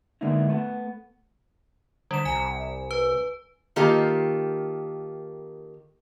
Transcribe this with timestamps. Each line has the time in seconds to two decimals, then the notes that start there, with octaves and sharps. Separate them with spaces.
0.21 D3 G#3 A#3 B3 D#4 E4
0.49 A3 B3 A4 F#5
2.11 D3 G3 E7
2.25 C2 G#5
2.91 B4
3.76 D#3 A#3 F4 G4 A4